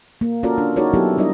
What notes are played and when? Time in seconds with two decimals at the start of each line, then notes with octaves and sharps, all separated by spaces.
0.21 A#3
0.43 C#4 F4 F#4 A4 A#4 D5
0.58 D4
0.76 D#4 F#4 G#4 A#4 C#5 D5
0.94 F#3 B3 E4 G4 A4
1.18 G3 D4 E4 A#4 D#5 E5